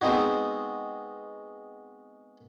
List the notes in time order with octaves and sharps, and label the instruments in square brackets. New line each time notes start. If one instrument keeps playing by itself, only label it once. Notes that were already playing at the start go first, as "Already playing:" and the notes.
[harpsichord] G#3 B3 C4 D#4 F#4